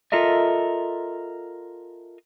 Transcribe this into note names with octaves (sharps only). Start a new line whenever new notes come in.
F4 A4 A#4 D#5 E5